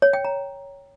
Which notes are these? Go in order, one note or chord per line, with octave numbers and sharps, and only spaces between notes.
C#5
G5
A#5